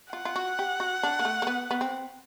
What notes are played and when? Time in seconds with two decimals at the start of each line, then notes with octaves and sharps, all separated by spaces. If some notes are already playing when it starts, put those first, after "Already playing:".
0.13 F4 F#5
0.25 F4
0.36 F#4
0.59 G4
0.80 F#4
1.03 D4
1.19 A#3
1.25 A3
1.42 A#3
1.47 B3
1.71 B3
1.81 C4